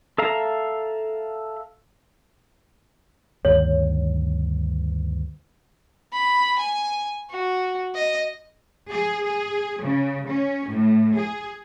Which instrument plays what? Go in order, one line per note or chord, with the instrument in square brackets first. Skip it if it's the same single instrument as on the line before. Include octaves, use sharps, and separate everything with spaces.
[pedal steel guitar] A4 E5 F5 A#5
[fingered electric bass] D2 G2 D#3 [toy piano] C#5
[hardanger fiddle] B5
G#5
F#4
D#5
[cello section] G#4
G#4
C#3
C#4
A2
G#4